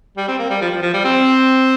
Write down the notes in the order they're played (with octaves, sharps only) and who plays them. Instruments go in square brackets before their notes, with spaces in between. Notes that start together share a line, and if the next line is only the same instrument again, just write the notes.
[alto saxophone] G3
C4
A#3
G3
F3
F3
F3
G3
C4